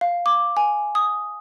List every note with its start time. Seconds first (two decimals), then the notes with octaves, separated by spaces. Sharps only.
0.01 F5
0.26 D6
0.57 G#5
0.95 D#6